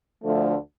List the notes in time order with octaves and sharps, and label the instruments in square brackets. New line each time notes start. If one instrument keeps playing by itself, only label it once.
[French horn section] D2 D3 F3 A3